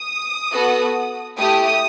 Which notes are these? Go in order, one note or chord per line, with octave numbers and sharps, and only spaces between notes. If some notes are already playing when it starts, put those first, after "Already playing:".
Already playing: D#6
B3 F#4 A4
A3 E4 G4 D#6